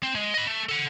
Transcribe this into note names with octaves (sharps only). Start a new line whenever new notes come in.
C4
G#3
D#5 B5
A3
A4 F#5